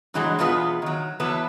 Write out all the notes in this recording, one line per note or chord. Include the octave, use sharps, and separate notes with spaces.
G2 B2 E3 F#3 G#3
E2 B2 B3 F4 G#4 B4
D#3 F#3
E2 E3 F#3 B3 B4 A5